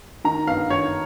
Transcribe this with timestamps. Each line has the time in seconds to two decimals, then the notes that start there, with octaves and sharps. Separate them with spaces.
0.25 D#3 A#5
0.47 B3 F5
0.70 D#3 C#5